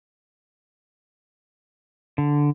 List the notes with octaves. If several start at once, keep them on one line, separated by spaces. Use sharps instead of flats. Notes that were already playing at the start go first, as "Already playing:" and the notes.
D3